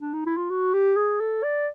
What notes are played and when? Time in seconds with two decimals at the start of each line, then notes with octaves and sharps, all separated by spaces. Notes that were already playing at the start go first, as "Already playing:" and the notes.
0.01 D4
0.13 D#4
0.26 E4
0.37 F4
0.50 F#4
0.74 G4
0.96 G#4
1.20 A4
1.43 D5